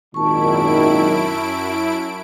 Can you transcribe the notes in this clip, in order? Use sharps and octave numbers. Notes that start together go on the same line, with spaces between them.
G#1 F#2 A#2 D#3 E4 A5 C#6 D7